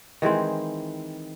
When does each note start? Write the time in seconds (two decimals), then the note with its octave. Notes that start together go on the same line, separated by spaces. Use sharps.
0.22 D#3 E3 G#3 C4